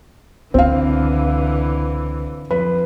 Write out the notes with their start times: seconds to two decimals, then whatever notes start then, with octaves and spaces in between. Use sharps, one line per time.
0.54 C#2 D3 E3 C4 F5
2.51 F2 B4